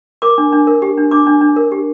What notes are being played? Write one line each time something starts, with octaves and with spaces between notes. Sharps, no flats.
A#4 D6
D4
D4
A#4
G4
D4
D4 D6
D4
D4
A#4
G4